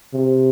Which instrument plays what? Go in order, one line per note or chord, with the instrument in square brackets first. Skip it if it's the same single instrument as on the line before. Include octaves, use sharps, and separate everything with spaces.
[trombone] C3